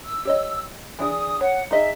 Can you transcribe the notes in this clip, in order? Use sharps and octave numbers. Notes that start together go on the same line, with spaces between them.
E6
G4 C#5 D#5
E3 D4 G#4 D#6
C#5 F#5
D#4 G#4 D#5 E5